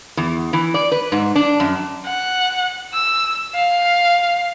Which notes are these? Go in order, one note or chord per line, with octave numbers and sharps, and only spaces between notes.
E2
E3
D5
B4
G#2
D4
F#2
F#5
E6
F5